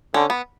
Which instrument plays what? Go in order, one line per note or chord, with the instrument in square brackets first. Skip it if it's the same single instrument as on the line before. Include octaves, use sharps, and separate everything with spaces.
[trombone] D3 [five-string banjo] C#4
[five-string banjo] B3